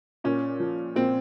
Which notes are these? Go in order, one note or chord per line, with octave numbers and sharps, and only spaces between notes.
A#2 C#4
F3
A#2 C4